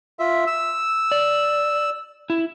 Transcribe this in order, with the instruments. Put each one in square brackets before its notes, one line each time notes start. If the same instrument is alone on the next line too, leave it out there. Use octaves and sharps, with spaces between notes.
[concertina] F4 E5
E6
[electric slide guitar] D5
E4